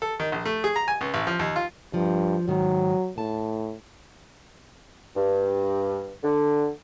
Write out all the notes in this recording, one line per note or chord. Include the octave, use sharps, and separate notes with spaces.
A4
D#3
A#1
A3
G#4
A#5
G#5
C#2
A1
F3
D#2
F4
G2 F3
G#2 D#3 F#3
A2 A5
G2
D3